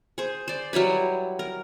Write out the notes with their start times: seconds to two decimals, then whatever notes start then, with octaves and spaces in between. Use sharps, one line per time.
0.18 G#4 C5
0.48 C5 D5
0.73 F#3 G3 E4 B4
1.39 A#4